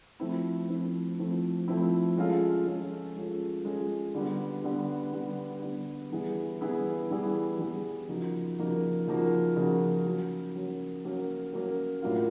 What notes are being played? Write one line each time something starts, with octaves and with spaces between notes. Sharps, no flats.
F3 A3 C4 E4
F3 A3 C4 E4
F3 A3 C4 E4
F3 A3 C4 E4
G#3 C#4 F4 A4
G#3 C#4 F4 A4
G#3 C#4 F4 A4
G#3 C#4 F4 A4
D3 G3 B3
D3 G3 B3
D3 G3 B3
D3 G3 B3
E3 G3 B3 E4 G#4
E3 G3 B3 E4 G#4
E3 G3 B3 E4 G#4
E3 G3 B3 E4 G#4
C#3 F3 A#3 D#4 F#4
C#3 F3 A#3 D#4 F#4
C#3 F3 A#3 D#4 F#4
C#3 F3 A#3 D#4 F#4
F#3 A#3 C#4
F#3 A#3 C#4
F#3 A#3 C#4
F#3 A#3 C#4
A2 F#3 A#3 D4 F4